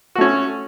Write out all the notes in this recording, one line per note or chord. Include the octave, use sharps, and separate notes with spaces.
A3 C#4 F#4